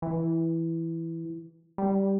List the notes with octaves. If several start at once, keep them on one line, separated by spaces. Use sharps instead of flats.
E3
G3